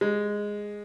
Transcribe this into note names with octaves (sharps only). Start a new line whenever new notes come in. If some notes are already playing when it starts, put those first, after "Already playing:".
G#3